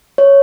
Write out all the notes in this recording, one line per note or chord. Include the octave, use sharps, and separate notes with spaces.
C#5